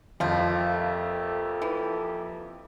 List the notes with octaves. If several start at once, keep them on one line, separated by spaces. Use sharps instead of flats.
F2 F3 A3 A#3 G4 A4 F5
E3